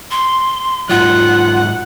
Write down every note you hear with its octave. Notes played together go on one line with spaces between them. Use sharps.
C6
G#2 F#3 F4 F#5